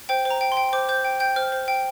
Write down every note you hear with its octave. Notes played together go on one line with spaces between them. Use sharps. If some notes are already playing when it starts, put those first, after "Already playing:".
C5 G5
C5
A#5
G5
C6
G5
C5 D6
C5 G6
G5
G5 G6
C5 F6
C5
G5